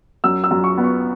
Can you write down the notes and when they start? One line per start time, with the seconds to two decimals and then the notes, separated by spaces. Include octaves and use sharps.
0.24 F#2 E6
0.44 E6
0.51 F#2
0.64 C#6
0.78 B3
0.84 C#6